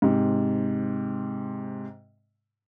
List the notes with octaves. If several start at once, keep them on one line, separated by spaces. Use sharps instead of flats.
G#2 C3